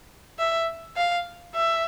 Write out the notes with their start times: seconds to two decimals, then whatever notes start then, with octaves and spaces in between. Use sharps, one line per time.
0.39 E5
0.96 F5
1.55 E5